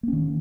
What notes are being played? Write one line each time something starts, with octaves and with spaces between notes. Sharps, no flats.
D#3 A#3 C#4